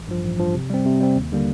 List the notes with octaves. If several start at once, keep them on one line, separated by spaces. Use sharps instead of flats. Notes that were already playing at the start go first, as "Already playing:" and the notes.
Already playing: A1
G2 F3
A1
G2 F3
C3
G3 C4
C3
G3 C4
D#2
D3 G3 A#3